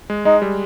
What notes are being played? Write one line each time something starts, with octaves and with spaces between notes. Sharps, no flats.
G#3
G#3 D#4
G3